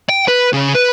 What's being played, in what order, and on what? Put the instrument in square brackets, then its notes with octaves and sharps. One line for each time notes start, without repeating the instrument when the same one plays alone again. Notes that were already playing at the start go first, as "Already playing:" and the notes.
[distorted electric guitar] G5
B4
C#3
B4